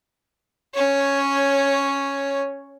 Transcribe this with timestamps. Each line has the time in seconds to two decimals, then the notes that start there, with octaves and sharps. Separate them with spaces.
0.74 C#4 C#5